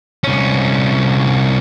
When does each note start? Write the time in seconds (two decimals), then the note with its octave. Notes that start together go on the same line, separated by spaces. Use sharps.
0.24 C2 C#4